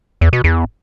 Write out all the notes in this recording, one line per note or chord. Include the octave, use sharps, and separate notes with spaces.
E2
B2
E2